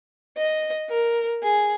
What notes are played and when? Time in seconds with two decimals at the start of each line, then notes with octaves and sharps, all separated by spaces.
0.37 D#5
0.90 A#4
1.43 G#4